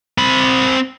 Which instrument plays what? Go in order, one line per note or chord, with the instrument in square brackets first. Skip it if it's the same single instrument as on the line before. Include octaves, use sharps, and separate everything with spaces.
[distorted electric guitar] C4 B5